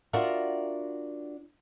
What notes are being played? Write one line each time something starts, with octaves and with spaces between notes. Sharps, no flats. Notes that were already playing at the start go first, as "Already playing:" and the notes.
D4 F4 F#4 A#4 D5 E5